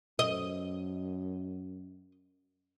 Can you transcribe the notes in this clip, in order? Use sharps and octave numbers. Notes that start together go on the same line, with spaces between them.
F#2 D#5